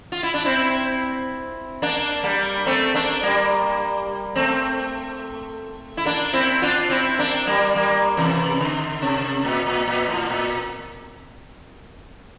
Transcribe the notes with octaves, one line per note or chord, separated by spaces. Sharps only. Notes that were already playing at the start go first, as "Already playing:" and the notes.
F4
E4
D4
C4 E4
A#3 D4
G3 A#3
A3 C4
A#3 D4
G3 A#3
A3 C4
E4
A#3 D4
C4 E4
D4 F4
C4 E4
A#3 D4
G3 A#3
G3 A#3
C3 E3
D3
C3
A#2
A#2
A#2
A2
A#2